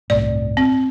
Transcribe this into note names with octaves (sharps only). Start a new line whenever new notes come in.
G1 C2 A2 D5
C4